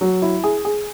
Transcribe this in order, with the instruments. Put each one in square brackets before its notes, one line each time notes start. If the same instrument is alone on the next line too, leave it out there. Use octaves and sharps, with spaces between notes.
[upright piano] F#3
E4
G#4
G#4